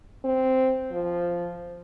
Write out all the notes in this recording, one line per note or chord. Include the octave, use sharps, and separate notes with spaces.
C4
F3